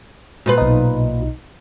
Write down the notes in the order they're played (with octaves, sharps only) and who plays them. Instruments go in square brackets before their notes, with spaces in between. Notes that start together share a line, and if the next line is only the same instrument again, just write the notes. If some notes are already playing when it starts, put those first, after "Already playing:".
[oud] A#2 F4 B4
[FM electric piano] B1 D#4